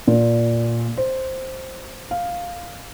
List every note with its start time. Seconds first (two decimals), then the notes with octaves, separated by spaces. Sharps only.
0.08 A#2
0.97 C5
2.11 F5